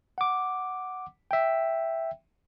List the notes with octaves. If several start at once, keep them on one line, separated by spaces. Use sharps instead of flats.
F#5 D6
E5 G5